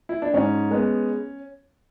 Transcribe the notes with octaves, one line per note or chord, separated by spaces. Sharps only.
E4
D4
G#2 C#4
G#3 B3